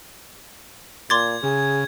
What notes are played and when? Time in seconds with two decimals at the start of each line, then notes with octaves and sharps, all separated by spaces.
1.10 A#2 C6 D6 G#6 A6
1.43 C#3 G#4